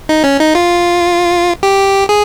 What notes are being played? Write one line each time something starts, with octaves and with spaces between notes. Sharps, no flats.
D#4
C#4
D#4
F4
G4
G#4